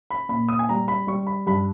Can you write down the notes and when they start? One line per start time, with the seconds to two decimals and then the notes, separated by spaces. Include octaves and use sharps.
0.10 B5
0.29 A#2 B5
0.49 D#6
0.59 G#5
0.69 G3 A#5
0.88 B5
1.07 G3 C#6
1.27 B5
1.46 G2 B5